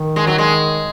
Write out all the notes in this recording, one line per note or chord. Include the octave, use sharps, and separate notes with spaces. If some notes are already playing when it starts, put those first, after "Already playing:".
Already playing: D#3
G#3
F#3
G#3